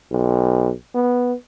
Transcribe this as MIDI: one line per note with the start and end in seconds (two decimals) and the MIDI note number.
0.11 0.72 35
0.95 1.33 59